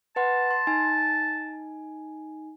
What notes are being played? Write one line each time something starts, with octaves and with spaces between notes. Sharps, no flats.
B4 F#5 A5 C6
C6
D#4 G#5